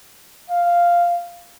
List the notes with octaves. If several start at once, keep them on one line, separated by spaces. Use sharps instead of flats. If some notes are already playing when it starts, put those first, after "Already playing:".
F5